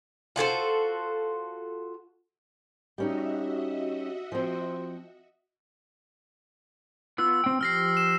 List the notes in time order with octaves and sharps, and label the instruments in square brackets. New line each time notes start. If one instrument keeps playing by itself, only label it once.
[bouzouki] F4 F#4 A4 C5
[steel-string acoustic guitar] G3 C#4 D#4 [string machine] F#4 D#5 E5
[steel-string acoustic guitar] F3 C4
[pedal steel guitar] B3 F4 F#6 [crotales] E6
[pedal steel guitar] C4 G5
[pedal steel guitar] F3 G4 [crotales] F6 A#6 C7
[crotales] E7